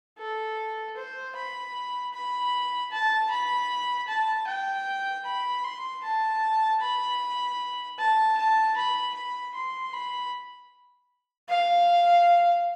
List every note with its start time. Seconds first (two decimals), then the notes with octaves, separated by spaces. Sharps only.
0.19 A4
0.96 C5
1.36 B5
2.14 B5
2.92 A5
3.31 B5
4.08 A5
4.47 G5
5.26 B5
5.64 C6
6.04 A5
6.81 B5
7.99 A5
8.38 A5
8.77 B5
9.15 B5
9.55 C6
9.93 B5
11.49 F5